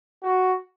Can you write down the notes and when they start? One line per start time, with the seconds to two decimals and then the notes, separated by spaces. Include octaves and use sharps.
0.23 F#4